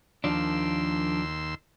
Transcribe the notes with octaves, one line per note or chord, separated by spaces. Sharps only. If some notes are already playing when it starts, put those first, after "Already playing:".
D#2 F3 D4 C6 E6